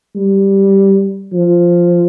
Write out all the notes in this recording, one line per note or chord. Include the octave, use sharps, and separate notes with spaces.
G3
F3